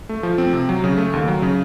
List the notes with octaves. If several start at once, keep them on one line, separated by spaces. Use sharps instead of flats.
A3
F3
C4
C3
F#3
C#3
A3
D#2
F#3
C#3